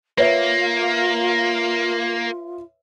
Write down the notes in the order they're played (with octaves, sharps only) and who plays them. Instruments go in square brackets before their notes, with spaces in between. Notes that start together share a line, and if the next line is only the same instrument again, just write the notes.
[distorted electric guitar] A#3 [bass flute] F4 [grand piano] B4 C#5 E5